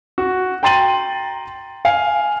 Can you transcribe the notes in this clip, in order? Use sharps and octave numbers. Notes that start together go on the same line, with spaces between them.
F#4
G5 A#5 C6 A6 D#7 F#7
F5 G#5